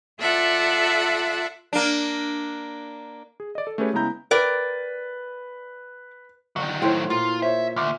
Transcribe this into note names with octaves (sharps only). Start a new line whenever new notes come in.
F4 A4 D5 E5 F#5
A#3 D4
G#4
D5 D#5
A4
A3 C#4 G4 G#4 B4 C#5
C#3 G#3 B3 E4 A#5 G6
A#4 B4 D5 G5
G1 D#3 F#3
A2 C5 C#5 F5 G5 C6
A#2 F4
C5 C#5 E5
D2 E5 D6 F6